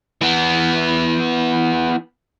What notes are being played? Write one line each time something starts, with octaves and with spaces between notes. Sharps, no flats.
E3 B3